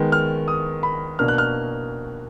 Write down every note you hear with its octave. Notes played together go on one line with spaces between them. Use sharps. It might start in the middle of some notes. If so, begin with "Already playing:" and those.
Already playing: D#3 G#3 B3
F6
D#6
B5
B2 A#3 D4 F6
F#6
F6